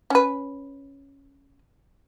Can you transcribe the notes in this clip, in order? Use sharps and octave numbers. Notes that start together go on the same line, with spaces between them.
C#4 B4